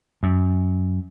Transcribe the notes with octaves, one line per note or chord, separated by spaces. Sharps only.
F#2